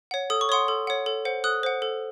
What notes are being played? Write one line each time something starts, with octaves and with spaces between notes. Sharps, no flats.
C#5 F#5
A4 D#6
C#6
C#5 F#5 C6 D#6
A4
C#5 F#5
A4
C5 F#5
A4 D#6 F#6
C5 F#5
A4